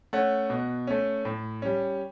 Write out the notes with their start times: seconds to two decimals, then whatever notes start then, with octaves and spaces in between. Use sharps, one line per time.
0.13 A3 C#4 F#5
0.50 B2
0.87 A3 C#4
1.25 A2
1.62 G3 C#4